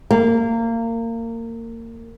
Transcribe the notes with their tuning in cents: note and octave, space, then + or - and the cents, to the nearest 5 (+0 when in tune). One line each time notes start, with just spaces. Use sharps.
A#3 -25